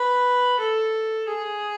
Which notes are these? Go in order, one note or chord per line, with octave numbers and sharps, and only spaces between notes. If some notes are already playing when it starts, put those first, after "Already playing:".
Already playing: B4
A4
G#4